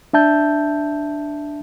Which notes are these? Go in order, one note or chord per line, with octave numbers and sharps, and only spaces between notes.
D4 E5 A5 G6